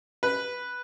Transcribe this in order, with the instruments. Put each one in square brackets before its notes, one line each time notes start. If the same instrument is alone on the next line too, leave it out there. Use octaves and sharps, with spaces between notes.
[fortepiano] B4